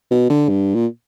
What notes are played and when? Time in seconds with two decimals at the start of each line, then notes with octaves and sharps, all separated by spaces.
0.11 B2
0.30 D3
0.49 G2
0.75 A#2